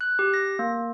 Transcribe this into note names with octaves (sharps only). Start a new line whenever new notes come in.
F#6
G4
A#6
A#3